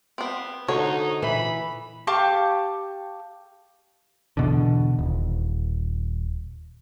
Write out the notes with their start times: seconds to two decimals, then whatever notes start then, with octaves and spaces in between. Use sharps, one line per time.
0.18 B3 C4
0.68 D3 D#4 F#4 C5 C#5
1.22 A#2 E3 B5
2.07 G4 F5 A5 C#6
4.37 E2 B2 D3
4.99 D#1